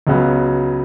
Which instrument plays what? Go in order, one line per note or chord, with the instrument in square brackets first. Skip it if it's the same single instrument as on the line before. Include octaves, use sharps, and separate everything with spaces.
[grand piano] C#2 C#3 F#3 B3